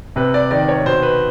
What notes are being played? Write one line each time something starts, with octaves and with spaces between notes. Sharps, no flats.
C3 B4
D5
D#3 D5
C#5
B2 C5
B4